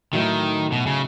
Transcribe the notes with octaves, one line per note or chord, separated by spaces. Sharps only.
A2 D#3 F#3 A3 D#4
B2
C#3